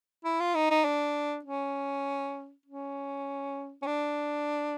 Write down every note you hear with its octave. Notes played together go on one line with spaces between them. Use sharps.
E4
F4
D#4
D#4
D4
C#4
C#4
C#4
D4